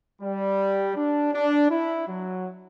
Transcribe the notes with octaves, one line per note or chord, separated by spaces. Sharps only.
G3
D4
D4
E4
F#3